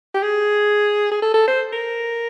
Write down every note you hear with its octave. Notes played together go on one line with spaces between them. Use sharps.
G4
G#4
G#4
A4
A4
C5
A#4